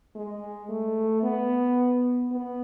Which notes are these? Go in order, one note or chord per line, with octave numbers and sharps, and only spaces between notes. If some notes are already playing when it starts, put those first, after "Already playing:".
G#3
A3
B3
B3